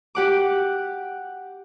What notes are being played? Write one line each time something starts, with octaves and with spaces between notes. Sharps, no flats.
G4 F#5 D6